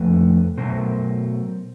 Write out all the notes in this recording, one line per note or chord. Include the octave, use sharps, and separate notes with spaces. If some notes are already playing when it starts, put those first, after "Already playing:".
Already playing: F2 D3 F3 A3 A4 B4
B2 F#3 A3 A#4 C5